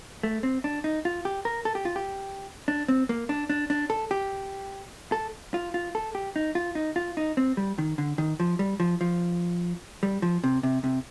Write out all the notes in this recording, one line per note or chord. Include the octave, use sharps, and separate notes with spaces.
A3
C4
D4
D#4
F4
G4
A#4
A4
G4
F4
G4
D4
C4
A#3
D4
D4
D4
A4
G4
A4
F4
F4
A4
G4
D#4
F4
D#4
F4
D#4
C4
G3
D#3
D3
D#3
F3
G3
F3
F3
G3
F3
C3
C3
C3